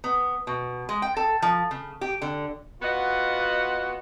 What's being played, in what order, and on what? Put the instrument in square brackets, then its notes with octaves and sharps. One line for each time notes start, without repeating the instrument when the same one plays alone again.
[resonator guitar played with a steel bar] B3
B2
G#3
G5
A4
F3
C#3
G4
D3
[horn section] B3 F4 F#4 D#5 F#5